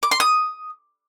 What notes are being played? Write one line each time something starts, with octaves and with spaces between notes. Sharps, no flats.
D6
C6
D#6